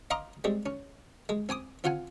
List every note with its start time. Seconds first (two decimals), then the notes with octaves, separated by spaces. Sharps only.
0.11 D#5 F5 A#5 C6 D6
0.44 G3 G#3 C4
0.66 C#4
1.29 G#3
1.49 C4 G#5 D6 D#6
1.84 C4 F4 F5 F#5 G#5